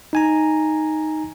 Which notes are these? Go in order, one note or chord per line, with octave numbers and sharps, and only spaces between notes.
D#4 G#5 A#5